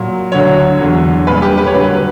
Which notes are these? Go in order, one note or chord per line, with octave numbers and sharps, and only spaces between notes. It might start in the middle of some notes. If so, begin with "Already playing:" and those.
Already playing: A#2 F#3
D2 D3 F#3 C#5
E2 D3 F#3
A#2 G3 B4
G4
B4
C#5
G2 D3 F#3 B4